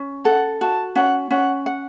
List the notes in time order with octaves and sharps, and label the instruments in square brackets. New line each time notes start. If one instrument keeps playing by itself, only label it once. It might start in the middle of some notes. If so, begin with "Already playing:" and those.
Already playing: [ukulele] C#4
[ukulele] A4 [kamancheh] F#5
[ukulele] F#4 [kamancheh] A5
[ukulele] C#4 [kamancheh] F#5
[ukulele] C#4 [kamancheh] F#5
[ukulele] F#5